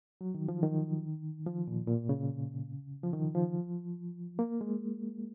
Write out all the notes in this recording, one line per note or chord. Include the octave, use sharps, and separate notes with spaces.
F#3
D#3
F3
D#3
F3
A#2
A#2
C#3
F3
D#3
F3
A#3
G#3